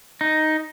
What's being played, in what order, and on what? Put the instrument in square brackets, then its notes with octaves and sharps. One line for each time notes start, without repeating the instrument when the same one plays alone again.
[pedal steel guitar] D#4